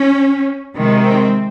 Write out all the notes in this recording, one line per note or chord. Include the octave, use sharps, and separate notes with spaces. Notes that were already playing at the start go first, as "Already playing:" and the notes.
Already playing: C#4
C3 D#3 G#3
C4